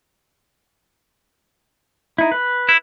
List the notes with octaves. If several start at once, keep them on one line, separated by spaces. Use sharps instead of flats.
D#4 E4
B4
E4